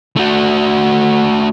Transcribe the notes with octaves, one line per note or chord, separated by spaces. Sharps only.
A3 F#4